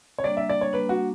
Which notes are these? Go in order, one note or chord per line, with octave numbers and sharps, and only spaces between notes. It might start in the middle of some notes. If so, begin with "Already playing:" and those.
C#5
G3 A#3 D4 D5
E5
D5
C#5
G3 A#3 D4 B4
F#4